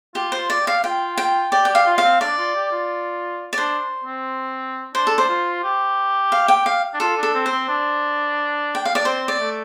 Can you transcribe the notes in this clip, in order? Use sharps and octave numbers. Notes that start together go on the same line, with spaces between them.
F4 G4
C5
F4
D5
G4
F5
F4 G5
G5
G4 D5
G4 G5
F5
F4
F5
C4
D4 D5
F4
G4
F4
D5
D4 C5
C4
D4 C5
A4
C5
F4
G4
F5
G5
F5
D4
F4 A4
D4
A4
C4
C5
C4
D4
G5
F5
D4 D5
C4 C5
D5
A3